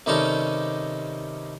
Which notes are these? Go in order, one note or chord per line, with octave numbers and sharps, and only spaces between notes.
C3 D#3 G3 C#4 D#4 A4